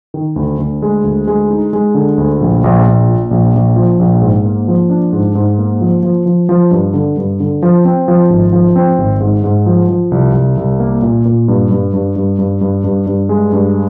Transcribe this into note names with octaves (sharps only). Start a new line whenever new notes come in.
D#3
D2
D2
G#3
D2
G#3
D#4
G#3
D3
D2
A#1
A#1
A#1
A#2
A#1
A#1
F3
A#1
G#2
A#3
F3
D4
G#2
G#2
A#3
F3
F3
F3
F3
G2
D3
G2
D3
F3
C4
F3
G#1
F3
C4
G#1
G#2
G#2
F3
F3
C2
C2
C2
A#3
A#2
A#2
G2
G2
G2
G2
G2
G2
G2
G2
G#3
G2